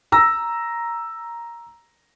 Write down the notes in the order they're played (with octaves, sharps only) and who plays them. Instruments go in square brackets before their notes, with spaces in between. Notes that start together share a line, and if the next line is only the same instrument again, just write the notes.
[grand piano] A#5 E6 A#6